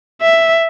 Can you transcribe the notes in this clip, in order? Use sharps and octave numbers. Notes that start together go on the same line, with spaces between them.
E5